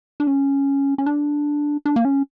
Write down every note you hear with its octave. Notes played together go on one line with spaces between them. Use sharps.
D4
C#4
C#4
D4
D4
A#3
C#4